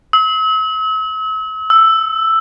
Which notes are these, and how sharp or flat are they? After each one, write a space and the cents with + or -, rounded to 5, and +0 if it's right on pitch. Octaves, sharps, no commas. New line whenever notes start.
E6 -40
E6 +5